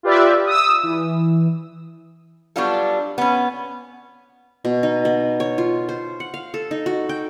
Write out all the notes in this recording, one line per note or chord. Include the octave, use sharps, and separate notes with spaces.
F4 G4 B4 D5 E5
D#6 E6
E3
F#3 G3 B3 D4 F4 A4
B3 C#4
B2
D#4
B3
C#5
F4
C5
F#5
F5
A4
D#4
F#4
G5